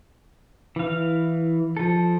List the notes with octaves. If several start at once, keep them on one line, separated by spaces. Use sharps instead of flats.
E3 F5
F3 A4